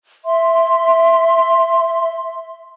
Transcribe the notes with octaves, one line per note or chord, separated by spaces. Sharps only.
E5 C6